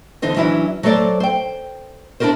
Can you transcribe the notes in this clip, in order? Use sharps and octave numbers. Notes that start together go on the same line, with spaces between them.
D3 E3 D#4 C5 D#5
E3 F#3 C#4 D4 E4
F#3 A3 A4 C5 D5
C5 G5
D4 E4 F#4 A#4 C5